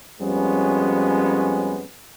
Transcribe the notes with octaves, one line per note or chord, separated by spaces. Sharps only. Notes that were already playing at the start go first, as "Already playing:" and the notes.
F2 G3 G#3 B3 C#4